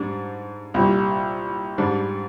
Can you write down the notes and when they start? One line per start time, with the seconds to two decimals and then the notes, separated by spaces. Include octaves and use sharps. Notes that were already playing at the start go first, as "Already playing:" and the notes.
Already playing: G#2 G3 D4
0.74 C2 A#2 G3
1.78 G#2 G3 D4